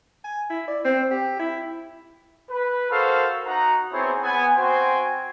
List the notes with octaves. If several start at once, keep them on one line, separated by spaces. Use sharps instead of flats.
G#5
E4
D5
C4
G4
E4
B4
F#4 A4 A#4 C5 F5
D#4 F#4 F#5 A#5
B3 C4 E4 G#4 C5 C#5
B3 G#5
C4 F#4 C5 G5 G#5 C6